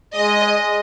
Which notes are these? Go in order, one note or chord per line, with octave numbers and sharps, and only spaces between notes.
G#3 D#5